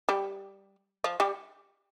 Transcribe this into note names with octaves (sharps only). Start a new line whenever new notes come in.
G3 G4
F3 F4
G3 G4